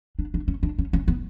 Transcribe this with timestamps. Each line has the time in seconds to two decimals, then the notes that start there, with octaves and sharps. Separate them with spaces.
0.19 D4
0.34 D4
0.48 C#4
0.63 D4
0.79 C#4
0.93 C#4
1.08 B3